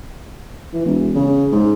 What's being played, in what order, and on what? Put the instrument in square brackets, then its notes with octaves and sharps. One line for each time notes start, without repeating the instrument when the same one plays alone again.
[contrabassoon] E3
E1
C#3
G#2